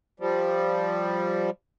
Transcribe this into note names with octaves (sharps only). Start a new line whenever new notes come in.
F3 G3